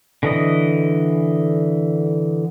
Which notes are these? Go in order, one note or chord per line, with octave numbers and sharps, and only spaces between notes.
D3 E3 D#5